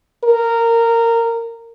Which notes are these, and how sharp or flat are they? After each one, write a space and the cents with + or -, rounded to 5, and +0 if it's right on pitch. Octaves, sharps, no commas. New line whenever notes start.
A#4 -15